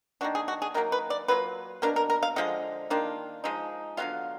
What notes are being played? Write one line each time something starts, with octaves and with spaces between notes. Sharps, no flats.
D#3 A#3 D4 F#4
G#4
F#4
G#4
D#3 F#3 A#3 A#4
B4
D5
F#3 A#3 F4 B4
B2 A#3 D4 A#4
A#4
A#4
F5
D3 F3 G#3 D#5
D#3 A#3 D4 F4
F3 G#3 D#4
D3 F#3 B3 F4 F5